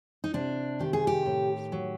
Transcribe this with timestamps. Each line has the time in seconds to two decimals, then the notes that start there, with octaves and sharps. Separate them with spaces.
0.24 D#4
0.34 C3 D4
0.80 D#3 G4
0.93 G#4
1.07 G4
1.26 A2
1.72 F#3